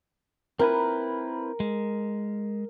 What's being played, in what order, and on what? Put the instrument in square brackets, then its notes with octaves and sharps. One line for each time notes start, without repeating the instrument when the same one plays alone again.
[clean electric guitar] C4 E4 B4 [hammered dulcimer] A#4
[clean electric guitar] G#3